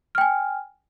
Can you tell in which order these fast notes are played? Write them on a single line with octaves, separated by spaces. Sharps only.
F6 G5 G#5